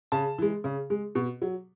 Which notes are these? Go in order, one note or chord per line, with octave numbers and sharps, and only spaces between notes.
C#3 A5
E3 G#3
C#3
G#3
B2
F#3